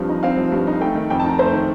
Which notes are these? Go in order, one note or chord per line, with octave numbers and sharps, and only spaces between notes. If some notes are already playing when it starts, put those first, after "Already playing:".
Already playing: G2 F3 C4
D#4
C4 F5
F3
G2
D#4
A3 G5
D#3
F2 G5
D#4 A5
A#5
A3 C5
D#3